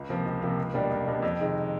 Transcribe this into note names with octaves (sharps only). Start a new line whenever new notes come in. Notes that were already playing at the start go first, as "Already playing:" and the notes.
Already playing: C#2
C3 F3 A#3
C#2
C3 F3 A#3
C#2
B2 G3 A#3 D4
C#2
B2 G3 A#3 D4
F2
C3 D#3 G#3